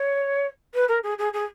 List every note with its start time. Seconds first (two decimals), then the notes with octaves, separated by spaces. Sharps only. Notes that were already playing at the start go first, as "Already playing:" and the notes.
Already playing: C#5
0.74 B4
0.88 A#4
1.03 G#4
1.18 G#4
1.33 G#4